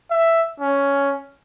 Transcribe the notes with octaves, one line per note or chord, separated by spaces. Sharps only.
E5
C#4